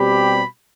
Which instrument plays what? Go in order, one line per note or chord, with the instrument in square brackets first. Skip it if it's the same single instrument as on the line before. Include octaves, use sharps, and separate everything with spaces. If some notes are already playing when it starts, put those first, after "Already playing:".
Already playing: [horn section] B2 G3 C4 G4 [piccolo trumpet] B5